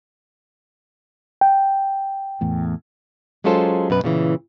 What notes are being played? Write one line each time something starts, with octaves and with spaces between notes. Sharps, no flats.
G5
E2 A2
F#3 G#3 C#4 F4 A4 C5
F#2 B2 B4
A#2 C#3 E3